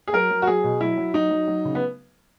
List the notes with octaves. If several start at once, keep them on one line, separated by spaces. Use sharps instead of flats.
G#4
F#3 A#4
F#3
F#4
F#3 G#4
B2
F#3 E4
F#3
F#3 D#4
F#3
F#3
C#3
B3